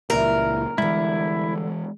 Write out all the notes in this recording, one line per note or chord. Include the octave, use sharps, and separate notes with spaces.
C#2 A#2 E3 G3 E4 A#4
D3 E3 G3 G#3 E4